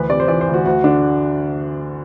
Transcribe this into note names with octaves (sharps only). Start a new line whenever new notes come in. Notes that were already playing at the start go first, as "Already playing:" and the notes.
Already playing: D2 E3 B4
C3 D5
C5
E3 D5
C5
D2
F#4
D2 F#4
D3 D4